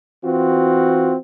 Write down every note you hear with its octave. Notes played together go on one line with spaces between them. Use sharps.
E3 C4 F4 F#4